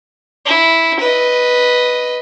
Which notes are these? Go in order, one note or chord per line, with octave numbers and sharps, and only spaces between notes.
E4
B4 D#5